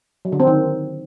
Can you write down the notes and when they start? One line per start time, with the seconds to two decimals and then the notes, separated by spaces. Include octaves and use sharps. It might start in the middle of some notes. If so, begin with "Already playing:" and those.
0.25 F#3
0.32 D3
0.40 C4
0.47 D#3